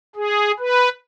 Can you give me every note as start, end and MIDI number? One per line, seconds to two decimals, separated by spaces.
0.16 0.51 68
0.59 0.89 71